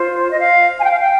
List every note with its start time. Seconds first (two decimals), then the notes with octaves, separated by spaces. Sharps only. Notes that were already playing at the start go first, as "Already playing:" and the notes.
Already playing: F4 C5
0.31 D#5
0.40 F5
0.78 G#5
0.84 G5
0.91 F5
0.99 G5